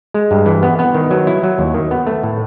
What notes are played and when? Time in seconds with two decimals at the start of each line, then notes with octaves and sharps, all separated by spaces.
0.14 G#3
0.31 G2
0.46 E3
0.63 B3
0.79 B3
0.94 D#3
1.10 F#3
1.27 E4
1.43 F#3
1.59 D#2
1.74 D#3
1.91 B3
2.06 A3
2.23 A2